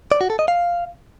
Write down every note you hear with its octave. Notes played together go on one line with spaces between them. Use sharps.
D5
F#4
A4
D#5
F5